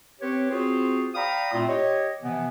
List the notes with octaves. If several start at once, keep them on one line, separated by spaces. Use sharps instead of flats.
C4 G4 B4 C#5
C4 F4 F#4 G#4 C5
D5 F5 G5 A#5 B5 D#6
A#2 A3 C4 E4 F4
G4 C#5 D#5
C3 E3 F3 B3